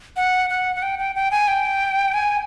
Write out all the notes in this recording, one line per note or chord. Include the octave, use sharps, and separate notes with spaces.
F#5
F#5
F#5
G5
G5
G5
G#5
G5
G#5